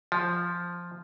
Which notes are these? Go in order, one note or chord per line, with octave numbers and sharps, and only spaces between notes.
F3